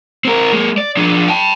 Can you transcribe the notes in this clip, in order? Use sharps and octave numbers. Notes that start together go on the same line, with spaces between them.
C4 A#4
G#3 A#3
D5
F3 D4
G5 A5